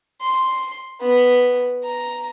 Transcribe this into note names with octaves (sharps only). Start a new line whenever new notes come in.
C6
B3
A#5